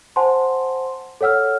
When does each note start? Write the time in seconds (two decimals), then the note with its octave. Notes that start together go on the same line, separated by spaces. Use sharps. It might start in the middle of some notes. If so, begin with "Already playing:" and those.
0.16 C5 F#5 G#5 A5 C6
1.21 A4 C#5 F#5 E6 F6